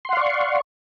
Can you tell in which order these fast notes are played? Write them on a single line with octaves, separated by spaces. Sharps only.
C6 F#5 F5 D5 C#6